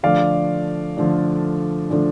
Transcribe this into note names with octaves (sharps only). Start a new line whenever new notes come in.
D3 F3 A3 D4 D5 F5
D3 F3 A3 D4
D3 F3 A3 D4